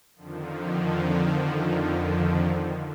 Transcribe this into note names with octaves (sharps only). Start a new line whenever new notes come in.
F2 D3 D#3 F3